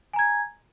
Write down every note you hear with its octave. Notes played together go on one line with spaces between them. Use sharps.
G#5 A#5 G#6